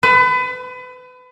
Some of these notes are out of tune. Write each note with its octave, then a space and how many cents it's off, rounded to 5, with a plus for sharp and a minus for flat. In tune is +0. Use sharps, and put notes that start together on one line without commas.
B4 +30